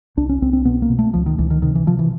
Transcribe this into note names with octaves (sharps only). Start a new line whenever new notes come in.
C2 D4
C#4
C2 C4
C4
B2 B3
A#3
B2
A3
C#2 F3
D#3
C#2 E3
D#3
C3 D#3
E3
C3 F3
E3